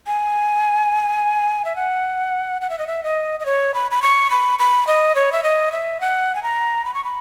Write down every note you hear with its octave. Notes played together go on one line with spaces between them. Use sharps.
G#5
E5
F#5
F#5
E5
D#5
E5
D#5
D#5
C#5
B5
B5
C#6
B5
B5
D#5
C#5
E5
D#5
E5
F#5
G#5
A#5
B5
C#6
B5